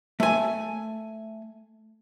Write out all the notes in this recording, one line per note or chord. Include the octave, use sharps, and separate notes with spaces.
A3 G#5